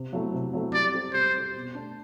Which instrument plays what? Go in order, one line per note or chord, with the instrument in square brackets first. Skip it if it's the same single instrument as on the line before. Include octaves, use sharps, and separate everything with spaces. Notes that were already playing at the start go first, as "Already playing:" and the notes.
Already playing: [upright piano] C3
F#3 A3 E4
C3
F#3 A3 E4
[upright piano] G3 [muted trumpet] D5
[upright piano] C4 G4
[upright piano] G3 [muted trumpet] C5
[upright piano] C4 G4
B2
A3 D4